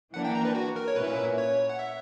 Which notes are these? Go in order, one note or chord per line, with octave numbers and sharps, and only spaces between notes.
E3 A#3 D4 F#5
G5
A#5
B4
F#4
A#4
C#5
A#2 A#3 C#4 E4 B4
C#5
F#5
E5